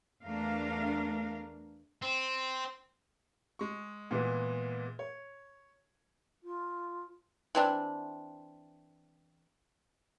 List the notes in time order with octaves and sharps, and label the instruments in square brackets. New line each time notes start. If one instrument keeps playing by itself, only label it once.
[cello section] E2 A3 D4 A#4 F5
[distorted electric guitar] C4
[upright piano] G#3 C#6
A#2 E3 G#3 B3
C#5
[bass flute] F4
[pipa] E3 C4 D4